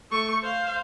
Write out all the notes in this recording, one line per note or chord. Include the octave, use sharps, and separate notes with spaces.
A3 C#6
C5 F5